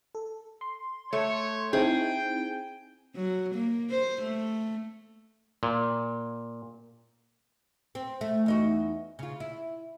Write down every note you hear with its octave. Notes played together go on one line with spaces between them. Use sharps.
A4
C6
A3 C#5
C4 D#4 E4 G#4 G5
F#3
A#3
C5
A3
A#2
C4
A3
E2 D#4 F#4
C#3 F4
E4